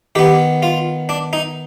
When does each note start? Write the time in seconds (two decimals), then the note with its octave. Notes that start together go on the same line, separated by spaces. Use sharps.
0.15 D#3 B3 G4
0.63 F4
1.09 D4
1.33 D#4